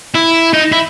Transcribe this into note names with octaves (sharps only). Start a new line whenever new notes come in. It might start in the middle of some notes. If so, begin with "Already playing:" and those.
E4
D#4
E4